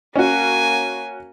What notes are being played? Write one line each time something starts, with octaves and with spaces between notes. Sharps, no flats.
A#3 C#4 F#4 G#5